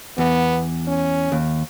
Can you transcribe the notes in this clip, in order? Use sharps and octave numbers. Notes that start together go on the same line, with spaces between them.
E2 B3
C#4
D#2